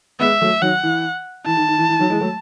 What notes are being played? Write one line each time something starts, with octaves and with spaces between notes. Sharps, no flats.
G#3 B3 E5
F#3 A3
D#3 F#3 F#5
E3
E3 A5
D#3
D#3
E3
E3
D#3 F#3
E3 G#3
F#3 A3